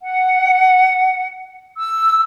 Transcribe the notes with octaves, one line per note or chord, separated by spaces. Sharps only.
F#5
E6